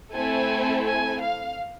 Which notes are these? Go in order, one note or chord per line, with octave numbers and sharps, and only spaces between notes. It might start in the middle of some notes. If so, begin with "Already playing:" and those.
A3 C4 E4 A4 G#5
G#5
F5